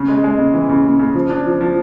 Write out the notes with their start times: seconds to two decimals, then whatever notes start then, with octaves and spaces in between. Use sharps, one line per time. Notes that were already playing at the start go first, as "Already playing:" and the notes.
Already playing: C#3
0.08 G#3
0.24 G#3
0.39 C#3
0.54 E3
0.69 C#3
0.84 C#3
0.99 C#3
1.14 F3
1.30 D4
1.46 F3
1.61 F3